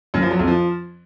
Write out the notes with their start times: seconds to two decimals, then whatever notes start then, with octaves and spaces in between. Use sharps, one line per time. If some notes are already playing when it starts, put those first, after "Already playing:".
0.14 F#2
0.22 F3
0.31 F#3
0.39 F2
0.47 F3